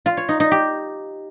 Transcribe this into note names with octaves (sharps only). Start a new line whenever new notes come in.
F4
C#5
D#4
D#4
G4